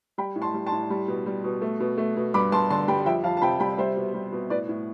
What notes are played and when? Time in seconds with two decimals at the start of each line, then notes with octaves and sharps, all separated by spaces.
0.18 G3 G5 B5
0.36 A2
0.42 A5 C6
0.54 G3
0.67 A5 C6
0.72 A2
0.90 G3
1.08 B2
1.26 G3
1.44 B2
1.62 A3
1.80 B2
1.98 A3
2.17 B2
2.34 G2 B5 D6
2.52 G2 A5 C6
2.70 D3 A5 C6
2.88 G3 G5 B5
3.06 F2 E5 G5
3.24 F2 F5 A5
3.37 A5
3.42 C3 G5 B5
3.60 G3 G5 B5
3.78 G3 C5 E5
3.96 B2
4.14 G3
4.32 B2
4.50 A2 B4 D5
4.69 A2